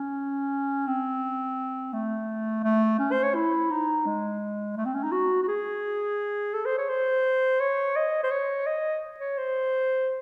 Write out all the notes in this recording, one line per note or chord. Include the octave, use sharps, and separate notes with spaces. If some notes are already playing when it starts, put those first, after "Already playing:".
Already playing: C#4
C4
A3
A3
C#4
C5
C#5
E4
D#4
G#3
A3
C4
C#4
D#4
F#4
F#4
G#4
A4
C5
C#5
C5
C#5
D#5
C5
C#5
D#5
C#5
C5